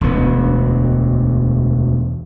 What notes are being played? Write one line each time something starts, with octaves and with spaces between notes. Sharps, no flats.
E1 D2 B3